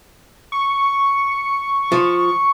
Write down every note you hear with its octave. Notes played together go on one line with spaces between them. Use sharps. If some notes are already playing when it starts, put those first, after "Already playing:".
C#6
F3